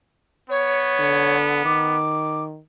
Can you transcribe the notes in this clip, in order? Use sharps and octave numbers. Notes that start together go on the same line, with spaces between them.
B3 C#5
D3
D#3 D6